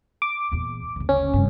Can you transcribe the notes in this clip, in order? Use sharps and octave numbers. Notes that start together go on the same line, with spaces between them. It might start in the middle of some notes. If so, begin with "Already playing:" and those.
D6
E2 A#2
F#1 D2
C#4
F1 G2